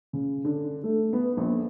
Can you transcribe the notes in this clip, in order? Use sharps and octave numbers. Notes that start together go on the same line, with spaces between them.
C#3
D3
A3
B3
A#1